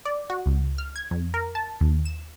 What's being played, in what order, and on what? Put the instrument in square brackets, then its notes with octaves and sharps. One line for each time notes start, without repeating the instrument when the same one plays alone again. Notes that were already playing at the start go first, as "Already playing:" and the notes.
[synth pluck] D5
F#4
C#2
F6
G#6
F2
A#4
A5
D#2
E7